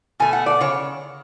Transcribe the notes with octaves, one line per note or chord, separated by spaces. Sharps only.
B2 A3 G#5
F#5
D5
C#3 C#5